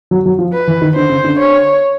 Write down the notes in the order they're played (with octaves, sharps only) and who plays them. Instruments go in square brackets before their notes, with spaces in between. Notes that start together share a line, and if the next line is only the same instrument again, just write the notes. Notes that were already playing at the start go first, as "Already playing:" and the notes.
[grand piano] F#3
F#3
F3
[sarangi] B4
[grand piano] E3
D#3
[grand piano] D3 [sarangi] C5
[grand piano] C#3
D3
[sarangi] C#5